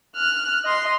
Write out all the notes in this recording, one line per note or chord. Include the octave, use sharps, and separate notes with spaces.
F6 F#6
D#5 C6